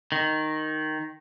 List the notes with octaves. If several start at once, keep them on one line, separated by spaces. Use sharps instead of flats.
D#3